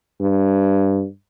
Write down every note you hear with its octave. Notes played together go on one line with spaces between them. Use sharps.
G2